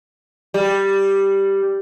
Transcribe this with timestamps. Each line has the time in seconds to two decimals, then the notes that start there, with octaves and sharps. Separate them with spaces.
0.54 G3